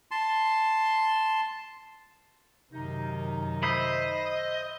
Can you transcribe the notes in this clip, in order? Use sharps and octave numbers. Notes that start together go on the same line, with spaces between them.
A5 C6
F#2 C3 D#3 D#4
C5 D#5 E5 B5